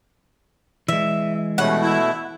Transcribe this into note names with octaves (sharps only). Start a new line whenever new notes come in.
E3 G#3 E5
B2 G3 A3 C#4 F#5
E4